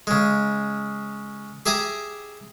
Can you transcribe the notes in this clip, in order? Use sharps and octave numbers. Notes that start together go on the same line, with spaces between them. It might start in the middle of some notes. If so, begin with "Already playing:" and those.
C#3 G#3
G4 G#4 E5 A#5 D6 D#6